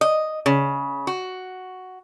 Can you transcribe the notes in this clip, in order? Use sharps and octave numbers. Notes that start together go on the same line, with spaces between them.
D#5
C#3
F#4